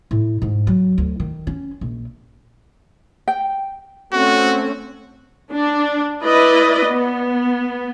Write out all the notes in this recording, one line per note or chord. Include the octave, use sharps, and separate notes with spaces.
A2
G#2
F#3
D2
D#3
C#4
A#1
G5
A3 C4 C#4 F#4
D4
E4 B4 D5 D#5
B3